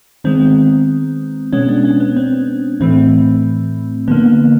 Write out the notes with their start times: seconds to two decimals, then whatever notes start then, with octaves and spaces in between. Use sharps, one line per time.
0.24 D#3 G#3 B3 C4
1.53 B2 G#3 B3 C#4
1.69 D4
1.85 C#4
2.00 B3
2.17 C4
2.80 A2 E3 A3 C4
4.08 D3 F3 A#3 B3